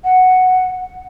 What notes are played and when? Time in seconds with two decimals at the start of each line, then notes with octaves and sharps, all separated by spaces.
0.04 F#5